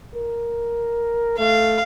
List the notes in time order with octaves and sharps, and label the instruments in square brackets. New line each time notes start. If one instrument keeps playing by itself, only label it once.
[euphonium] A#4
[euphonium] A3 [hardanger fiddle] F5